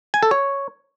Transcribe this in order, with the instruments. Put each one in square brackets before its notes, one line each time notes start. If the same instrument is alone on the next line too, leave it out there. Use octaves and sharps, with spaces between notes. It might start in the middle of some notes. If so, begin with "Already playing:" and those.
[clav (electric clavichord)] G#5
A4
C#5